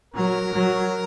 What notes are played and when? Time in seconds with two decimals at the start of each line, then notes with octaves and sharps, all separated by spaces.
0.14 F#3 A#4
0.53 F#3